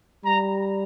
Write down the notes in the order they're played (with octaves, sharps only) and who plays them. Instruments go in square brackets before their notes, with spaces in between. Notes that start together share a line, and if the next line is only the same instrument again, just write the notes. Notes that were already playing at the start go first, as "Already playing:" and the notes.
[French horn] G3 [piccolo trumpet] A#5